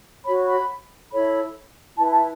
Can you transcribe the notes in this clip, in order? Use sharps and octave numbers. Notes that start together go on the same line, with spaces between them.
F#4 C#5 B5
B5
E4 A4 C#5 B5
E4 B4 A5
A5